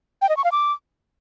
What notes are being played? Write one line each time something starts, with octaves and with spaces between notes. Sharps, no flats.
G5
D#5
C#6
F5
D6